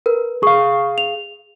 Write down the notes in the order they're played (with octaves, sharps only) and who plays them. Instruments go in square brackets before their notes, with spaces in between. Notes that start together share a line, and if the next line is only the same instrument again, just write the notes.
[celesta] A#4 B4
[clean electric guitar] G#4 F5 [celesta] C#6
[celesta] F7